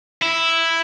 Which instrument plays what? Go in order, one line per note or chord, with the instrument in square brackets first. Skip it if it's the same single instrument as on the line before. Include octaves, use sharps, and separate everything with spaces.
[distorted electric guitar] E4